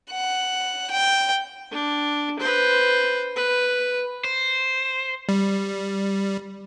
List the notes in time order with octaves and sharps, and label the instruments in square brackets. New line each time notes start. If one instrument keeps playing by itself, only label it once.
[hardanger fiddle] F#5
G5
[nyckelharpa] D4
B4 C5
B4
[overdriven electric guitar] C5
[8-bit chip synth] G3